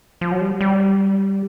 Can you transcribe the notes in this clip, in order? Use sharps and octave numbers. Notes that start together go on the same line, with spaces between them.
F3
F#3
G3
G3